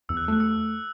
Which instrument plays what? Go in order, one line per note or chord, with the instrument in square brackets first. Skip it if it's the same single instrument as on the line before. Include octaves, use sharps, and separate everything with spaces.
[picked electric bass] E2 [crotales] E6
[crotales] F#6
E6
[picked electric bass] A3 [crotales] F#6
[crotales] E6